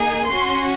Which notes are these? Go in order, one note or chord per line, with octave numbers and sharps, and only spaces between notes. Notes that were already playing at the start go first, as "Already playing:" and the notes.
Already playing: A#3 D#4 G#4
C#4 F#4 C6